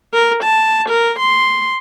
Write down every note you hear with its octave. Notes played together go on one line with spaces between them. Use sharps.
A#4
A5
A#4
C6